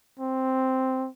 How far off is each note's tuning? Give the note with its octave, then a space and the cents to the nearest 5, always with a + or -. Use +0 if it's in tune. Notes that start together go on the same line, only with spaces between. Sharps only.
C4 +0